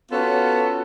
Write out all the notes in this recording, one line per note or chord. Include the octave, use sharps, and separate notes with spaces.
B3 C#4 F4 F#4 A4